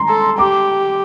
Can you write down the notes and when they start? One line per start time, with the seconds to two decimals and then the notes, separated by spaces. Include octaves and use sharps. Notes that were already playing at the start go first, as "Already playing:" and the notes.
Already playing: A#5 C6
0.08 A4
0.38 G4 D6